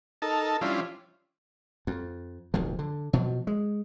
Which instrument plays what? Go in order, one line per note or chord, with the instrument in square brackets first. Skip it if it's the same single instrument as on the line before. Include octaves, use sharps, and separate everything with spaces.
[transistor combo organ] D#4 A4 A#4 A5
F3 G3 C#4 D4 E4 F4
[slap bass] F2
D1 B1 F2 F3
D3
B2 F3 F#3
G#3